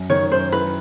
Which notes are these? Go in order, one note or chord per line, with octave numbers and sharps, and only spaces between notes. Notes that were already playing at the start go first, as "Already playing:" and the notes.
Already playing: F#2
D#3 C#5
F#2 C5
E4 B4